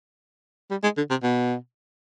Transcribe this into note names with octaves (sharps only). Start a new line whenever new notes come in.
G3
G#3
D3
C3
B2